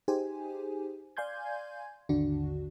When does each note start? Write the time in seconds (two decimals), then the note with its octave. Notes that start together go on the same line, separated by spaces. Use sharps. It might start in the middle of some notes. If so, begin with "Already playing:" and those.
0.08 D#4 G4 G#4 C5 G#5
1.17 D5 F5 G#5 C6 G6 G#6
2.09 G#1 D#2 D3 D4 F#4